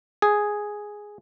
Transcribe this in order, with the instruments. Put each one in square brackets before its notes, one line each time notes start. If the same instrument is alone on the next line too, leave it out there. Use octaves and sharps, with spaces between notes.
[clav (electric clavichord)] G#4